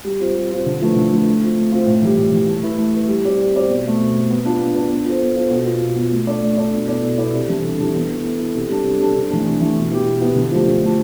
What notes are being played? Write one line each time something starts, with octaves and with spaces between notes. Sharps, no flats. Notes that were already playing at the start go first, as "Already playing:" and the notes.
G3
C4 F4 C5
G3
C4 F4 C5
D3
F3 A3 E4 B4
D3
F3 A3 E4 B4
A3
C4 F4
A3
C4 F4
A2
E3 G3
A2
E3 G3
A3
E4 B4
A3
E4 B4
G3
C4 G4 D5
G3
C4 G4 D5
B2
A3 C4
B2
A3 C4
B3
D4 F4 B4
B3
D4 F4 B4
B3
F4 A4 C5
B3
F4 A4 C5
B2
B3 F4
B2
B3 F4
A3
D4 A4 D5
A3
D4 A4 D5
B2
B3 E4 A4 D5
B2
B3 E4 A4 D5
C3
E3 G3 D4 A4
C3
E3 G3 D4 A4
B3
E4 A4
B3
E4 A4
C3
G3 D4 A4
C3
G3 D4 A4
C3
E3 A3 D4
C3
E3 A3 D4
B2
B3 E4 G4
B2
B3 E4 G4
D3
F3 A3 D4 G4
D3
F3 A3 D4 G4